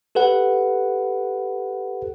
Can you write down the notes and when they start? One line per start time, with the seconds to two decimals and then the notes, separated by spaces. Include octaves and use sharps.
0.15 G4 A4 B4 F#5